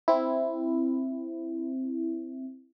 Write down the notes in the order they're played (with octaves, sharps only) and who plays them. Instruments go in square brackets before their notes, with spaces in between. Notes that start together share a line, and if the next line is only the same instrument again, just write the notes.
[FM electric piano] C4 E4